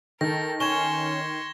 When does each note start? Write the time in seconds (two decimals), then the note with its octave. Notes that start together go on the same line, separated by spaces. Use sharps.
0.21 D#3 A4 A#4 A#6
0.60 C#4 C6 C#6 G#6 E7 G7